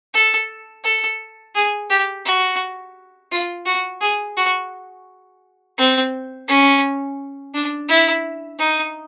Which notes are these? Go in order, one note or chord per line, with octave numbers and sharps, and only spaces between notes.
A4
A4
G#4
G4
F#4
F4
F#4
G#4
F#4
C4
C#4
D4
E4
D#4